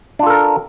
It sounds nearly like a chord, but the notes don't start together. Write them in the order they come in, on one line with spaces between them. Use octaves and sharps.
D4 F4 A4 A#4